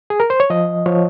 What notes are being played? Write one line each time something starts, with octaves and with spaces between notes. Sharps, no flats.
G#4
A#4
C5
C#5
F3 D#5
F3 C#5